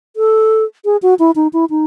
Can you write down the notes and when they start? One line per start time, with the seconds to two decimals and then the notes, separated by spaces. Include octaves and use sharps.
0.16 A4
0.85 G#4
1.02 F#4
1.19 E4
1.36 D#4
1.53 E4
1.70 D#4